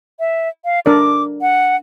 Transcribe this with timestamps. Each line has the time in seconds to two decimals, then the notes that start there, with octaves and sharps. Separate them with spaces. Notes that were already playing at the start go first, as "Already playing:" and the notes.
0.20 E5
0.65 F5
0.86 D4 A#4 D5 D6
1.41 F#5